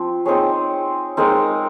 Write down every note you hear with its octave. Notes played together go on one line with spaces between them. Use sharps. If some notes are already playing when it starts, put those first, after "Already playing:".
Already playing: F3 C4
C4 D#4 G#4 C#5
G#3 C4 D#4 A#4